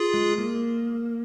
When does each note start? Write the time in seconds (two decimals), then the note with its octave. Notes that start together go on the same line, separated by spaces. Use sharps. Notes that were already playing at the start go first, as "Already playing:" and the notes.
Already playing: F4 G#4
0.14 G#3
0.38 A#3